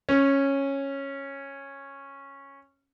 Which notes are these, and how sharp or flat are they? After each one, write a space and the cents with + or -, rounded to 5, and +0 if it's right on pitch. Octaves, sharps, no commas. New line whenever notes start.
C#4 -10